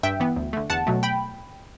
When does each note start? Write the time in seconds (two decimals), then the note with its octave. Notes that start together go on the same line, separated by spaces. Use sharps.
0.03 G2 E5 G5
0.20 E3 B3
0.36 D2
0.53 D3 A3
0.70 E2 F#5 A5
0.87 B2 F#3 A3
1.03 G5 B5